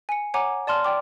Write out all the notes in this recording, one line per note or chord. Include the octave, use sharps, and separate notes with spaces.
G#5 C#7
C#5 F#5 G#5 A#5 D6
D5 A5 C6 F6
D5 G5 D6